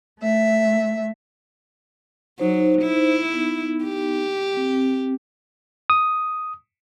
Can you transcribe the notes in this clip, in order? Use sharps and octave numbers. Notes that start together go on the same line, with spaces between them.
A3 E5
F#3 D#4 C5
E4
B3 D#4
G4
C4
D#6